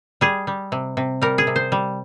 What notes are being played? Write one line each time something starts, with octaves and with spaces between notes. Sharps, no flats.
G3 G#4
G3
C3
C3
G3 A#4
G#4
C3
C5
G3